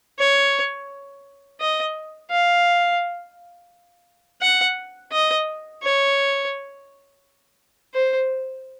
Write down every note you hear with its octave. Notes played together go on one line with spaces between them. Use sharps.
C#5
D#5
F5
F#5
D#5
C#5
C5